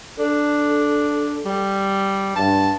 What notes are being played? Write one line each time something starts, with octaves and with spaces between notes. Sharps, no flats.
D4 A4
G3
G2 A5